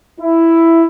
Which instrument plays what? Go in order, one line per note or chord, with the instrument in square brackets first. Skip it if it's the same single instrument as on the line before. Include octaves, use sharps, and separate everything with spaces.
[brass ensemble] E4